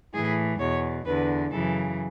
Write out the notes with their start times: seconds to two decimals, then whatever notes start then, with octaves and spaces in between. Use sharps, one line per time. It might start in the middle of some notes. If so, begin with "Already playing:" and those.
0.13 A2 E3 G#4
0.59 E2 B2 C#5
1.05 E2 D3 B4
1.51 F#2 C#3 E3 A4